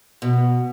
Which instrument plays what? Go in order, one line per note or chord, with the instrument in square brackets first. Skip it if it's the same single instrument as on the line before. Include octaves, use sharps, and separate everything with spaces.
[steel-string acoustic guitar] B2